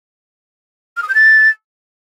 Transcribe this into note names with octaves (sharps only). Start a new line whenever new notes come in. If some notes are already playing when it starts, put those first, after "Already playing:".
F6
D#6
G6
A6